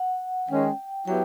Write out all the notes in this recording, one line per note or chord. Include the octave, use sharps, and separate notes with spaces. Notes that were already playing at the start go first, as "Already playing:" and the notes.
Already playing: F#5
D#3 G#3 C#4 G5
F#3 B3 E4 G4 G5